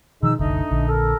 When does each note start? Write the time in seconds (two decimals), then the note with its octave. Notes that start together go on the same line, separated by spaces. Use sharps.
0.23 B2 D#3 F3 G#3 D#4 E6
0.39 F#1 C2 D3 A3 D4 D#4
0.71 A#1 D3
0.88 A4 A#4